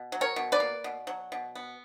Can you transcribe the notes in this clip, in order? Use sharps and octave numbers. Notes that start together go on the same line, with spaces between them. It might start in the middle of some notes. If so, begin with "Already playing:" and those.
Already playing: B2
F#3
A#4 C#5
B2
B4 D5
A#3
B2
F#3
B2
B3